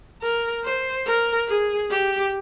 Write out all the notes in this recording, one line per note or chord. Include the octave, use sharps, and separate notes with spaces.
A#4
C5
A#4
G#4
G4